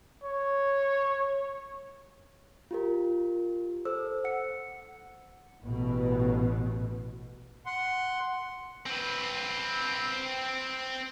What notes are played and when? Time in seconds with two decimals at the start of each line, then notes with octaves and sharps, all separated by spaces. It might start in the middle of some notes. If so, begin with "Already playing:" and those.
0.24 C#5
2.71 F4 G4 A#4
3.85 A4 C5 E6
4.24 F#5 C#7
5.62 A1 B2
7.66 F#5 C6
8.86 C4 B4